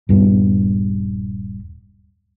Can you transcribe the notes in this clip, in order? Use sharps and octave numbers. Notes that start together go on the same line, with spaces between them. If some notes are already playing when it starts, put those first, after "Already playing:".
D#1 G2 B3